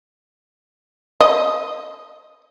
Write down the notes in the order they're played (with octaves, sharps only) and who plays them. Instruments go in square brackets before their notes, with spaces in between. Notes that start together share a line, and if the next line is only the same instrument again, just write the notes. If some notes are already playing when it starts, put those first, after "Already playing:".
[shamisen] D#5